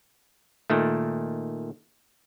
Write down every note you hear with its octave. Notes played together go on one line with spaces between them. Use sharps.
A#2 D#3 A3